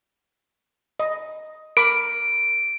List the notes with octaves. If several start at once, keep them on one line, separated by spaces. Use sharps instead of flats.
D#5
A#4 B5 D6 D7